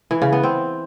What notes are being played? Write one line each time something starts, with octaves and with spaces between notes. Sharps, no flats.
E3
C#3
B3
C4